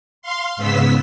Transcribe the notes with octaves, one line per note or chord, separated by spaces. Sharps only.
F5 C6
G#2 C#3 B3 E6 B6